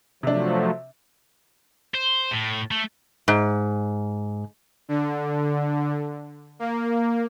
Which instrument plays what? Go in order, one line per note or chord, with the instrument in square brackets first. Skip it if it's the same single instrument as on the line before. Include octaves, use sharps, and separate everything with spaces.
[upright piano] C3 D4 [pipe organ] F3 F#3 A3
[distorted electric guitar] C5
A2
A3
[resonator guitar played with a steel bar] G#2
[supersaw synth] D3
A#3